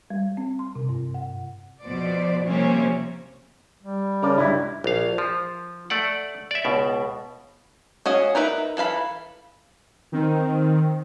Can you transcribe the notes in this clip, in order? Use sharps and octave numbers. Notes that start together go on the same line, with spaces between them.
G3
C4
C6
C3
G2
F#5
F2 B2 F3 C5 D5
C3 F3 G3 A#3 C4 C#4
G3
C#3 A#4 D5 A5
C#2 G2 E4
A#1 F5
F3
A3 D5 F#5
D5 E5
C#2 B2
C#4 F#4 D#5 F5
D#4 A#4 B4 E5
E3 A4 F5 B5
D#3 C4